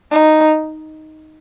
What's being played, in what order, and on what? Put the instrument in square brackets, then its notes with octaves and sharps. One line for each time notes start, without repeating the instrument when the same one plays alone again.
[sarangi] D#4